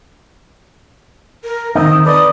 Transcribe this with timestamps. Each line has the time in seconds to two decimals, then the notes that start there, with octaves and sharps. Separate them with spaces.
1.44 A#4
1.75 D#3 C4 D#4 D#6
2.06 A4 B4 D5 D#6